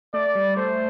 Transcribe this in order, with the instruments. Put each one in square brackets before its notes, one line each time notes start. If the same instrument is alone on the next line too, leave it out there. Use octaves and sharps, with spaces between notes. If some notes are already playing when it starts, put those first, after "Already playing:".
[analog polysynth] A3 [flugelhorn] D5
[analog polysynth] G3
[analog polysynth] A3 [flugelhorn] C5